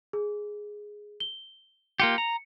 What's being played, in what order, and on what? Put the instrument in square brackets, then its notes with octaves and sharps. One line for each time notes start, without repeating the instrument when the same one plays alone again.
[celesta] G#4
G7
[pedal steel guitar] A#3 F4 G4 [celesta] C#7
[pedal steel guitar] A#5